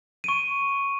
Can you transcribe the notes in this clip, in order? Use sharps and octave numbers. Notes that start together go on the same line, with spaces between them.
C#6 D7 D#7